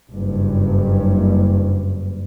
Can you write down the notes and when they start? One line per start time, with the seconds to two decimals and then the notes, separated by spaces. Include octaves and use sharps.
0.12 F#1 G2